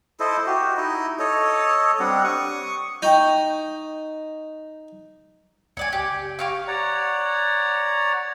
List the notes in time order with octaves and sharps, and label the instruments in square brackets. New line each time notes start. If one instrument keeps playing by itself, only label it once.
[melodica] E4 A4 C5 D#5
F#4 G4
D#4 E4 D#5
A4 C#5 D#5
G3 C4 D4 F#5
C#6 D#6
[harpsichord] D#4 [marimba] G5 C#6 G6
[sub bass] C2 [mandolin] C#5 D5 G#5
[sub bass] F#1 [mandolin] G4
[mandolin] G4 F5 C#6
[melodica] C#5 D5 F#5 A#5